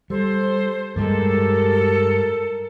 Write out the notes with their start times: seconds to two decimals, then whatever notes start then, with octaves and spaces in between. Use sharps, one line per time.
0.10 G3 A4 C5
0.96 G2 G3 G#3 G4 A4 A#4